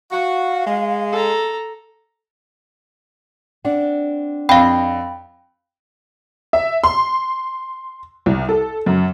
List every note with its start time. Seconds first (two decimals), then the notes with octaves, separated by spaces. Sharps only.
0.12 F#4 F5
0.67 G#3
1.12 A4 A#5
3.64 C4 D4 F#5
4.49 F2 F5 G5 B5
6.53 E5
6.84 C6
8.26 C2
8.49 A4
8.86 F#2